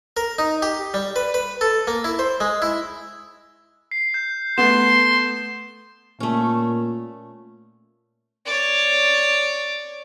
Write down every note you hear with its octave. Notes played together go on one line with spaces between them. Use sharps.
A#4
D#4
G4
G3
B4
B4
A4
A#3
E4
C5
G#3
E4
C7
G6
A3 B3 C6 E7
A#2 A3 C#4
C#5 D5